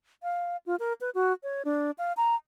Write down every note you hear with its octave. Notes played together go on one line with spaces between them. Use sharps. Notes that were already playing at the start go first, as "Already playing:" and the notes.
F5
F4
A#4
B4
F#4
C#5
D4
F5
A#5